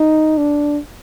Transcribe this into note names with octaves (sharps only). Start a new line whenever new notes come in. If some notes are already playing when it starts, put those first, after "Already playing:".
Already playing: D#4
D4